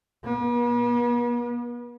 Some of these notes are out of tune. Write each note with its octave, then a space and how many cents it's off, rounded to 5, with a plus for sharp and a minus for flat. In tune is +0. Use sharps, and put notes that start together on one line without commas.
B3 -45